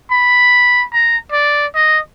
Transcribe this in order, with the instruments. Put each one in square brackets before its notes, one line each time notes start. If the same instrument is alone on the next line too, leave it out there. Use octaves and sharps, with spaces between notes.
[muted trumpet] B5
A#5
D5
D#5